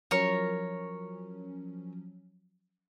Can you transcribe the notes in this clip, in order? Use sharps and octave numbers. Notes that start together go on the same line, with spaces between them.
F3 F#3 C#4 A#4 C#5